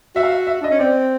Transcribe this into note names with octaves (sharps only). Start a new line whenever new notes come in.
F#4 E5
F5
E5
E5
D4 D#5
C#4
C4 D5